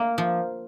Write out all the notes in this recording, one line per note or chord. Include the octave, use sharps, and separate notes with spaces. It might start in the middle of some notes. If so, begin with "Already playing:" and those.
Already playing: A#3
F3